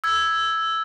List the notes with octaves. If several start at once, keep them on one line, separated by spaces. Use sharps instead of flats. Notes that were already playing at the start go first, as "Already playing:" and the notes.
E6 G#6